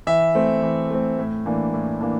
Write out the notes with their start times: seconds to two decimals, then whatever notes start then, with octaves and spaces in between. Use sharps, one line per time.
0.07 E3 E5
0.35 A3 C4
0.62 E3
0.90 A3 C4
1.18 A2
1.46 E3 A#3 D4
1.74 A2
2.01 E3 A#3 D4